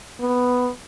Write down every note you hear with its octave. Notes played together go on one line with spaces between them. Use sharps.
B3